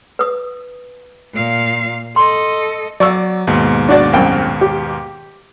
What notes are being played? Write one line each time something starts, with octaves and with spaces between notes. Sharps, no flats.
B4 D#6
A#2 F5
A4 D#5 C6
F#3 D5 C#6 E6
D#2 G#2 B2
D4 F#4 D5
C2 F#2 G5
G4